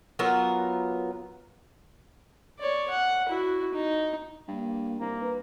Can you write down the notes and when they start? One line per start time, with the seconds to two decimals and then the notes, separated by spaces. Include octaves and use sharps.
0.19 F#3 B3 F4 A#4
2.59 C#5 D5
2.90 F#5
3.29 E4 F#4
3.73 D#4
4.48 G2 A#3
5.00 C2 A#3
5.21 G2 B4